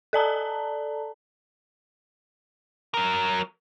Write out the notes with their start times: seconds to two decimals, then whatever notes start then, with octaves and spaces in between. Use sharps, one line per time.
0.13 A4 D5 A5 A#5
2.94 F#3 A#4